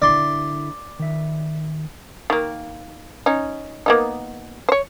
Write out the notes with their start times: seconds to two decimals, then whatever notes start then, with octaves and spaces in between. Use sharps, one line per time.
0.02 D3 E4 D5 C6
0.99 D#3 E5
2.30 D#3 A#3
3.26 C#4 D#4
3.86 A#3 B3 D#4
4.69 C5 C#5